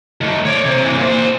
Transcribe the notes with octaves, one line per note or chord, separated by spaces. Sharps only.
D#3 A3
C#5 D5
C3
C3 E3
A#2 C5